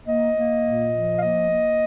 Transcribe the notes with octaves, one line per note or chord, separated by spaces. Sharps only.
A#3 D#5
A#3
A#2
F3
F5
A#3 D#5
A#3